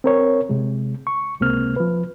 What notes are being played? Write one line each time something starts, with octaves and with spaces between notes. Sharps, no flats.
C4 A#4 C#5
C3 G#3
C#6
C#2 C3 G#3 A#3 C4 F6
F3 B4